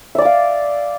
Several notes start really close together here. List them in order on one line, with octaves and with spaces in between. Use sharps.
E5 D5 D6 F5